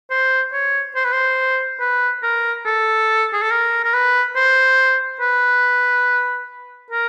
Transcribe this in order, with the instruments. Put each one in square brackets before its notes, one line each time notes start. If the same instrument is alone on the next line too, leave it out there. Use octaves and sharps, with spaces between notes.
[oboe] C5
C#5
C5
B4
C5
B4
A#4
A4
G#4
A4
A#4
A#4
B4
C5
B4
A#4